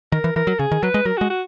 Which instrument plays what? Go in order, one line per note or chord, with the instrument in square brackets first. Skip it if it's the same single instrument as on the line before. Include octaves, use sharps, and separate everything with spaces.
[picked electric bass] D#3 [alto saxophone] A#4
[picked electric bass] E3
[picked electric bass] E3 [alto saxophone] A#4
[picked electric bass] F#3
[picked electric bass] C#3 [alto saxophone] G#4
[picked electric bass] D#3
[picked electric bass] F#3 [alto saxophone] B4
[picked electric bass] G#3
[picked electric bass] F#3 [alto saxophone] A#4
[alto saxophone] F#4
[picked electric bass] G#3
[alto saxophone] F#4